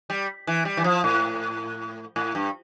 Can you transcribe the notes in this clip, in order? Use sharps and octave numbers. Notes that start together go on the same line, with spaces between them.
G3
E3
G3
E3
F3
A2
A2
G2